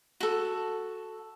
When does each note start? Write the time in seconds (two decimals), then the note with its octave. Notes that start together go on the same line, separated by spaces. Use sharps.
0.20 F#4 A4